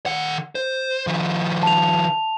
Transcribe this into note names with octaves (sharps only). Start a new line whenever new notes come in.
D#3 F#5
C5
D#3 F3
A5 F7